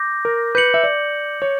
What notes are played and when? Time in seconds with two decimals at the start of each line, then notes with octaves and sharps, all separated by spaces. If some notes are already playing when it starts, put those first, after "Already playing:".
Already playing: D6 G6 A#6
0.25 A#4
0.55 B4 G6 C#7 F#7
0.74 E5
0.84 D5
1.42 C#5